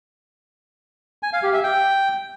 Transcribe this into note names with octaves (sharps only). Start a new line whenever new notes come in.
G#5
F5
G4
E5
G5